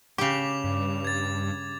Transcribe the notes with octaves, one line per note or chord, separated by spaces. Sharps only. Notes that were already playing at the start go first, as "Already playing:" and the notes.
C#3 G4 D6 F7
G2
G#6 A6